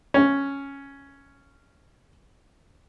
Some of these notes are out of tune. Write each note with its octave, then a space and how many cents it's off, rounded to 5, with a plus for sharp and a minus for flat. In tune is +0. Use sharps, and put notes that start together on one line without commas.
C#4 +0